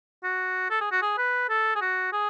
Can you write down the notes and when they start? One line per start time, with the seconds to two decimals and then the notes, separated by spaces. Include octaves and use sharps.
0.24 F#4
0.71 A4
0.81 G#4
0.92 F#4
1.02 G#4
1.18 B4
1.50 A4
1.76 G#4
1.82 F#4
2.13 G#4